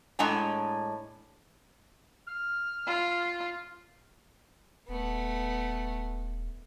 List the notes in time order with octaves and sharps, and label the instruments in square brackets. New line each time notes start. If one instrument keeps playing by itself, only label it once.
[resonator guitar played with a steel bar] A2 G#3 D4 G#5 A#5
[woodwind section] F6
[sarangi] F4
[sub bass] D#1 [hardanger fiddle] A3 B3